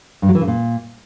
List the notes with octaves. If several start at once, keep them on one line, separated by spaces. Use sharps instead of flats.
G2
F#3
E3
C#3
A#2